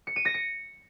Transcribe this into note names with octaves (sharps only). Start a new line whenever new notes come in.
C#7
D#7
A#6
C#7